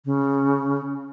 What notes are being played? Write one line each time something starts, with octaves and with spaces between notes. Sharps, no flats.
C#3